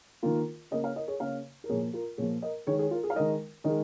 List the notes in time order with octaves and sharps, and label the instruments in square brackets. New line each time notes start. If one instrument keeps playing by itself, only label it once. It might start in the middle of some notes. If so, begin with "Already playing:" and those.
[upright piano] D#3 A#3 F4 A#4
C#3 A#3 A#4 D#5
C#5 F5
A#4 D#5
G#4 C#5
C#3 A#3 C#5 F5
A#4
A#2 F3 A#3 G#4 C#5
F4 A#4
A#2 F3 A#3 G#4 C#5
A#4 D#5
D#3 G#3 G#4 C#5
G#4 C#5
F4 A#4
G#4
F5
D#3 G#3 A#4 D#5
D#3 G#3 A#4 D#5